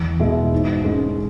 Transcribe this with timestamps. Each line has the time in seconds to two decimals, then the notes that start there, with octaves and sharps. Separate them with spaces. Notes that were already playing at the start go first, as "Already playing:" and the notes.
Already playing: E2
0.20 B2 G#3 E4
0.53 G#2
0.84 G#3 C#4